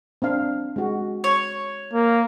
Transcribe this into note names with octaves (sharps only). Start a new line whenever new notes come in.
C4 D4 F5
G#3 F#4
C#5
A#3